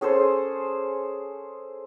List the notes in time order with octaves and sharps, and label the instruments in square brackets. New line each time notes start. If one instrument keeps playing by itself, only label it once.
[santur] C#4 G#4 A4 C5